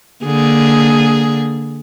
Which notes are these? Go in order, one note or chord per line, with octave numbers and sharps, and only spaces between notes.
D3 A#3 G#4